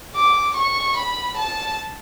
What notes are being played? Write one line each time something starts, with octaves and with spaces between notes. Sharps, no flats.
D6
C#6
B5
A5